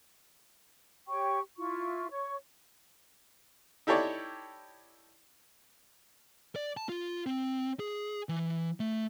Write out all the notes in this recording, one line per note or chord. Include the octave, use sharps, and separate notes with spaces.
G4 C#5 G5 C#6
E4 F4 C#6
C#5 C#6
D#4 E4 G4 A4 C#5 D5
D5
A5
F4
C4
G#4
E3
A3